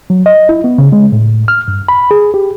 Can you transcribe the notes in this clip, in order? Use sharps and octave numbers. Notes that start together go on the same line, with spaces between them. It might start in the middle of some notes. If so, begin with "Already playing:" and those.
F#3
D#5
E4
B3
C#3
G#3
A2
F6
G2
B5
G#4
G4